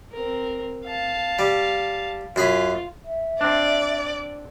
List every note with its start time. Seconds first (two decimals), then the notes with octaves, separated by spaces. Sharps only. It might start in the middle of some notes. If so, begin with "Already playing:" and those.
0.12 C4 A#4
0.86 F5 A5
1.39 G3
2.36 F#2 F4 G#4 B5
3.05 E5
3.41 C4 D4 D5